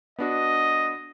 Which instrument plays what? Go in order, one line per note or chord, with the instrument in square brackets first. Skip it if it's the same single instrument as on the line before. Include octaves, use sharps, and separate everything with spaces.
[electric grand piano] B3 D4 F#4 [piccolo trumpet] D#5